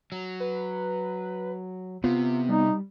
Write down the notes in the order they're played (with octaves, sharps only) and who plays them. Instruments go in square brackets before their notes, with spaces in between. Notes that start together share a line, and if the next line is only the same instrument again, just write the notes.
[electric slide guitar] F#3
[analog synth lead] B4
[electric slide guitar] C3 [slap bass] B3 [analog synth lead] F4
[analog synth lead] G3 [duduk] D#4